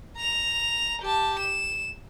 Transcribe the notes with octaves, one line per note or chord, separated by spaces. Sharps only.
A#5 F7
G4 A5
E7